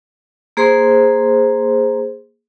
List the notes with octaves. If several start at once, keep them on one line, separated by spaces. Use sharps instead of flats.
A#3 G#4 C5 C6